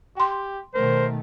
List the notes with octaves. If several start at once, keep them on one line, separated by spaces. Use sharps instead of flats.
G4 G5 C6
B2 D#3 A3 A#4 C5